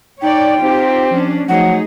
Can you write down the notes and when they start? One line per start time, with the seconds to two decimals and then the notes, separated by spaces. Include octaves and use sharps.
0.22 D#4 C#5 D5 G5
0.62 C4 D#4 F4 G4
1.11 F3 C#4 D4
1.49 F3 F#3 A3 D#4 G#4 F#5